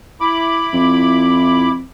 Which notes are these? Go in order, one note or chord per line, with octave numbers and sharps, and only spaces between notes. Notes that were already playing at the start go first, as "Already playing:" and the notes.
E4 B5 D6
F2